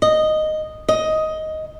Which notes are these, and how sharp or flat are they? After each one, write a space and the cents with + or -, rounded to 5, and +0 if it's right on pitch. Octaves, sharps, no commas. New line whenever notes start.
D#5 -5
D#5 +10